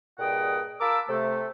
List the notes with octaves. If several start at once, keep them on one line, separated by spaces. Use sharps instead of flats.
G2 A#2 G#4 D#5 F#5 G5
F4 A#4 A5 B5 D6 E6
C3 A3 A4